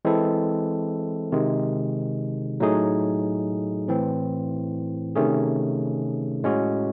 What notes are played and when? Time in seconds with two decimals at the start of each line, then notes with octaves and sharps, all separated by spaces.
0.05 E3 G#3 C4 E4 A4
1.32 C3 D#3 G#3
2.60 A2 F#3 A3 D#4 G#4
3.88 A2 E3 C4
5.16 C3 D#3 A3 C#4 G#4
6.44 A2 G#3 C#4 F#4